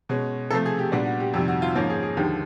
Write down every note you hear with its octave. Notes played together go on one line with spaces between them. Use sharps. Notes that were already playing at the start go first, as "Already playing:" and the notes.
B2 G#3 C#4
C3 F3 A3 A4
G#4
G4
A#2 G3 B3 D4 F#4
F#4
G4
F2 C3 D#3 G3 G4
F#4
F4
G#2 F3 A#3 C#4
G#4
G#4
D#2 D3 F3 G#3 G4